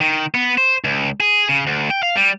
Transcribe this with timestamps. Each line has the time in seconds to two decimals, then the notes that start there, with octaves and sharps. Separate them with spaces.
0.01 D#3
0.35 B3
0.58 C5
0.84 C#2
1.20 G#4
1.49 C#3
1.67 D2
1.90 G5
2.03 F5
2.16 G3